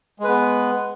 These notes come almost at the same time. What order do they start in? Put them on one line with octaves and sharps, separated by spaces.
G#3 B4 B3